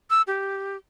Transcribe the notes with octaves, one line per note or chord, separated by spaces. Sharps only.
E6
G4